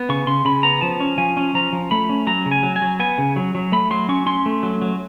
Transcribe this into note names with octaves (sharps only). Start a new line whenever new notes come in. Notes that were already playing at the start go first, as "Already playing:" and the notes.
Already playing: B3
C#3 C#6
C#3 C6
C#3 B5
B3 A#5
F3 A5
C#4
F3 G#5
C#4
F3 A#5
F3
A3 B5
C#4
F#3 A#5
C#3
G#5
F#3
G#5
F#3
B3 G#5
C#3
F#3
F#3
A3 B5
F#3 C6
C#4 C#6
C#4 C6
A3
F#3
F#3